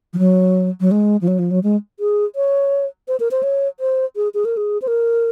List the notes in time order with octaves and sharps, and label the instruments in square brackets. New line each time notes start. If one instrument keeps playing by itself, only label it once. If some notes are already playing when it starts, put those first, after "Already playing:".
[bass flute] F3
F#3
F#3
G#3
F3
F#3
F3
F#3
G#3
G#4
C#5
C5
A#4
C5
C#5
C5
G#4
G#4
A#4
G#4
C5
A#4